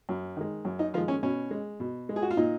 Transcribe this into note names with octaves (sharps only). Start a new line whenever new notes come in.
F#2
D#3 G#3
F#2
D#4
D#3 F3 G#3 F4
C#4
B2 C#4
G#3
B2
G#3
G#4
F#4
F4
A#2 D#4